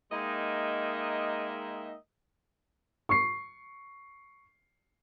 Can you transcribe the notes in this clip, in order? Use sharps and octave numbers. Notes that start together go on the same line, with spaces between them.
G#3 A#3 D#4 D#5 E5 G5
C#6 C7